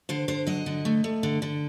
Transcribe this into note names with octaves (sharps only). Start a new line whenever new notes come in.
D3 C5
D3 C5
F#3 D#5
D3
A3
A3
D3
D3